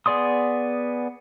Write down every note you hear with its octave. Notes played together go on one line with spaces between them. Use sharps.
B3 G#4 D5 C6 D#6